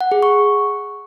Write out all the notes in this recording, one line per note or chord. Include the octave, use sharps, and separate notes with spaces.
F#5
G#4
C#6